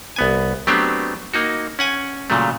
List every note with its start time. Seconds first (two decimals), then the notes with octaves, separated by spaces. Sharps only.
0.16 C2 B3 G#5
0.67 F#3 A3 B3 C4 D4 G4
1.34 A#3 D#4 F#4
1.79 C#4 F#5 G#5
2.30 A#2 C#3 F#3 A3